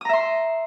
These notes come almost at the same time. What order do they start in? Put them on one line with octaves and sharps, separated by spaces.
D#6 A#5 E5 C6